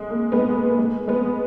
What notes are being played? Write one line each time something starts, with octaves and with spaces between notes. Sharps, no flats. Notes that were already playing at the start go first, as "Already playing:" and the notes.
Already playing: G#3
A#3
G#3 B3
A#3
A#3
G#3
G#3 B3